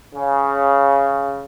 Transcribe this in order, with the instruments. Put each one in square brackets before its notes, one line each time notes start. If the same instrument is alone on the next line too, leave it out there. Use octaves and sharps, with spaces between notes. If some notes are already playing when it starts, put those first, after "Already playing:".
[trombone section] C#3